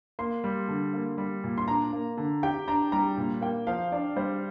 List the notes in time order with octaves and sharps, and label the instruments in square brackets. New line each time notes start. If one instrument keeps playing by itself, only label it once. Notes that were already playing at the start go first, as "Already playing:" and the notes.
[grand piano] A#3 [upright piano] C6
[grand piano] G3
D3
A#3
G3
A#2
[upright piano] C6
[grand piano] D4 [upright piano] A#5
[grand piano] A#3
D3
[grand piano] G4 [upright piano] G5
[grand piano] D4 [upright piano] A#5
[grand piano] G3 [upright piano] A#5
[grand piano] A#2
[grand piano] A#3 [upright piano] G5
[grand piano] F3 [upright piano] F5
[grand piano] D4 [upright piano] D5
[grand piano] G3 [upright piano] C5